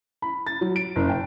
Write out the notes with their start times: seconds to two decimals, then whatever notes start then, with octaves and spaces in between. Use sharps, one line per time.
0.22 B5
0.47 A6
0.61 F#3
0.76 D7
0.96 F#1
1.10 G5